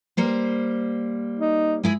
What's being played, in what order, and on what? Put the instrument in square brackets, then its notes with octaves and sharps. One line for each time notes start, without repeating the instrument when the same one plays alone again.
[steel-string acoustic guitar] G3 A#3 C5
[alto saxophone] D#4
[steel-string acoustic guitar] G#3 E4 G#4